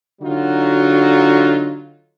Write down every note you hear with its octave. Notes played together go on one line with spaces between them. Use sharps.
D3 F#3 D#4 F4 F#4